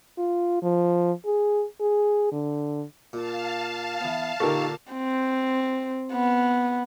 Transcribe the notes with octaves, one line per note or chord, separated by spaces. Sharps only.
F4
F3
G#4
G#4
D3
A#2 F5 A5
E3 B3
A#2 D3 D#4 G4 A4 A#4 C#6
C4
B3